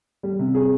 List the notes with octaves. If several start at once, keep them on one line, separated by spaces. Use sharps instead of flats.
G3
C3
G#4